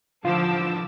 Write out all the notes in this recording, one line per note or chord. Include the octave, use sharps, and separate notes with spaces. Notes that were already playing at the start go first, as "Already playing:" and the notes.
D3 E3 F3 F4 A5 D6 E6